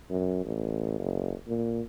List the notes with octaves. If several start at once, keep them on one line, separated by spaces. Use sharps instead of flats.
F#2
A1
F#1
A#2